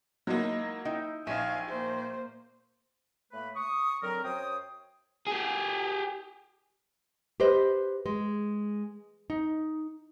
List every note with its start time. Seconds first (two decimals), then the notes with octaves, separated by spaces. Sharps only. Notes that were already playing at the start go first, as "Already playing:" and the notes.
0.27 F#3 G#3 A#3 D#4 E4
0.85 D#4 E4 G5
1.27 A#1 D#4 E5 F5 G#5
1.68 A#3 C5
3.32 A2 A3 A#3 B4 B5
3.56 C#6 D#6
4.03 D3 F#3 C4 A#4
4.24 F#2 C5 C#5 G5 D#6
5.27 G4 G#4
7.40 G4 B4 C5 D#5
8.06 G#3
9.30 D#4